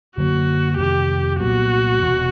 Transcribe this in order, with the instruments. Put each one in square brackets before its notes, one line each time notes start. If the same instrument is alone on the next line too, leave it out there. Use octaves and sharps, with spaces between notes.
[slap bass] F#2 D3 F#3 A#3 [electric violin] F#4
[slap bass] F2 C3 D#3 G#3 [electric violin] G4
[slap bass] C2 A#2 F#3 B3 [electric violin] F#4
[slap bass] E1 E2 C3